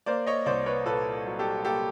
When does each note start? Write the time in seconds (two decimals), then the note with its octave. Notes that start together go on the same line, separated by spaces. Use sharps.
0.06 A#3 C5 D5
0.27 C#5 D#5
0.46 C2 C5 D5
0.66 B4 C#5
0.86 A#2 A4 B4
1.26 F#3
1.39 G4 A4
1.65 A#3 G4 A4